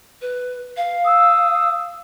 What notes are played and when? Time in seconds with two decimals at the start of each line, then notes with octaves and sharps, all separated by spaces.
0.22 B4
0.77 F5
1.05 D#6 E6